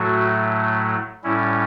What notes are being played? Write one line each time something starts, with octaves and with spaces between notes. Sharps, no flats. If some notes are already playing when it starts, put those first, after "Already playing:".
Already playing: A2 F#3 A3 F#4
A2 G3 C#4 E4